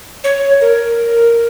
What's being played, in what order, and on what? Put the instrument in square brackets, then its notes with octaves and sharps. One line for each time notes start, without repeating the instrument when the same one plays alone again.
[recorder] C#5
A#4